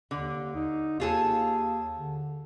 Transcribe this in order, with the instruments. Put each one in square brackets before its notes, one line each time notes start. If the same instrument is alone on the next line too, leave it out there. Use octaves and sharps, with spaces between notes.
[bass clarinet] D#2 [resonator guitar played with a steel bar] D3
[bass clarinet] D#4
[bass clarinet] D#2 [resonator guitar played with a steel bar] F4 G#4 A4
[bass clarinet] D3